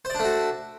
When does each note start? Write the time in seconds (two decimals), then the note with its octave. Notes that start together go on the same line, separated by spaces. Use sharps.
0.05 C5
0.10 D5
0.15 D4
0.20 A3
0.24 F#4